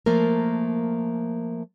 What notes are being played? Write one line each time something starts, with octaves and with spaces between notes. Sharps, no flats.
F3 A3 A#3 A#4